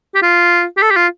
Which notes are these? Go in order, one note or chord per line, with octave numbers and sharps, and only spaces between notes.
G4
F4
G4
A4
G4
F4